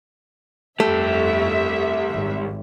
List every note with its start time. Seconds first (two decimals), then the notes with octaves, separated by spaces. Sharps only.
0.80 G1 C2 F2 A3 G4 E5
2.11 G#1